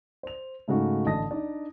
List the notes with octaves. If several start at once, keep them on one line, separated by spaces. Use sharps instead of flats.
C5 F7
G#2 C#3 A3 D#4 F#4
A1 D3 D#5 A5 D#6 A#6
D4 D#4 D5